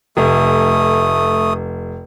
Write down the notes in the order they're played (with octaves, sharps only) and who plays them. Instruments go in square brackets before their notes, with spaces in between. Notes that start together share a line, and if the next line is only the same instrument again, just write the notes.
[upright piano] F1 [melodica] A3 D#6